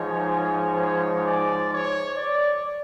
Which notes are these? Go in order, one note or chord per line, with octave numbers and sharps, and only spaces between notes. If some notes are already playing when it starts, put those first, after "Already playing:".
Already playing: G#2 F3 G#3 C#5
C#5
D5
C#5
D5